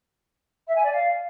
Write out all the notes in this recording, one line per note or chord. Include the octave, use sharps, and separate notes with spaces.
E5
G#5
D5
F5